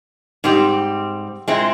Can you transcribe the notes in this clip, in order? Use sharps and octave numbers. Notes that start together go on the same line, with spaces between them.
G#2 G3 C4 G4
A#2 G#3 C4 E4